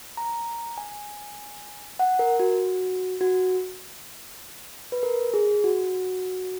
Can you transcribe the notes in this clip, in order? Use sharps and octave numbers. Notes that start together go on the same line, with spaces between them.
A#5
G#5
F#5
A#4
F#4
F#4
B4
A#4
G#4
F#4